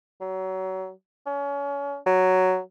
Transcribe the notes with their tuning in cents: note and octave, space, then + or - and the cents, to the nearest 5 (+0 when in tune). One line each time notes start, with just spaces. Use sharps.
F#3 +30
C#4 +30
F#3 +5